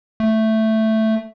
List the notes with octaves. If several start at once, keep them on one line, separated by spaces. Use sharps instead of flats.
A3